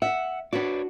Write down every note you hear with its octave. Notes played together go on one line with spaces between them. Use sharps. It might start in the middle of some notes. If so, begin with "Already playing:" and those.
E5 F#5
D4 F#4 B4 C#5 D5